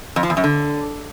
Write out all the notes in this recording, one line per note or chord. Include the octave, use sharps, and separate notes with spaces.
F2
F3
E2
F#2
D3